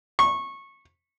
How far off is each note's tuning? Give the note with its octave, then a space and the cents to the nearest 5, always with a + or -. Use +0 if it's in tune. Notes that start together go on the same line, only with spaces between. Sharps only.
C#6 -20